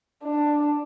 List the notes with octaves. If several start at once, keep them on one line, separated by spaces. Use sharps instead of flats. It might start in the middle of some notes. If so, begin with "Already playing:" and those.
D4